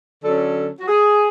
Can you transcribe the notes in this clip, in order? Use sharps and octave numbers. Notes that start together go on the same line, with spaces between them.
D3 F#3 C#4 A4
F#4
G#4